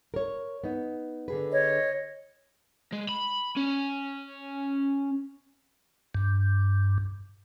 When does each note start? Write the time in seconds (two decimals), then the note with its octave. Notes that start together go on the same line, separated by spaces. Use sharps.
0.14 A#4 C#5
0.64 B3 D#4
1.28 D3 G#4 B4
1.51 C#5 D#5
2.93 G#3
3.09 B5
3.57 C#4
6.15 G2